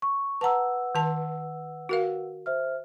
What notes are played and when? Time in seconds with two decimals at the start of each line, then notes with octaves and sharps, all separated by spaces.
0.02 C#6
0.41 B4 F#5 A5 A#5 E6
0.95 D#3 A5
1.89 F#4 A#4 F5
2.46 C5 E5 F6